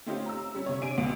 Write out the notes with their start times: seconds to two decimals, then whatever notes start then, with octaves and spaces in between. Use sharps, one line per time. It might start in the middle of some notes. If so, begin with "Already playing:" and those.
0.06 A3 C4 C#4 D#4 F4 G4
0.26 A#5 E6
0.55 G3 C#4
0.66 C3 C#5
0.82 C3 D4 G#5 D7 D#7
0.97 C#2 B2